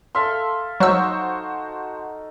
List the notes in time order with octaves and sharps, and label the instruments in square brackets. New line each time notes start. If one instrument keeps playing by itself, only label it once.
[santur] A4 E5 F5 [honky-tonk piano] C6
[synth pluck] F#3 E6 [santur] D#4 [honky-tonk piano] F#4 C5 C#6